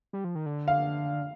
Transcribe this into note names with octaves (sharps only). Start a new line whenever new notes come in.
G3
F3
D#3
D3
F5